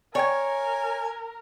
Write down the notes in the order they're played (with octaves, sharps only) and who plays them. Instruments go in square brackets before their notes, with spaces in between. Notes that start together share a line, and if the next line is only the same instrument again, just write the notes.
[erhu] A#4 [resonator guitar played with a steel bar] C#5 [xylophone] D5 G5 G#6 [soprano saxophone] G#5